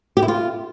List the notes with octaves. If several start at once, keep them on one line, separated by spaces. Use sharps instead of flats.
G4
E4
F4